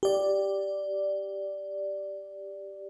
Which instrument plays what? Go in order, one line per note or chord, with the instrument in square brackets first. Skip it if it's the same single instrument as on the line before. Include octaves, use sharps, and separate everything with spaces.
[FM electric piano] G4 D5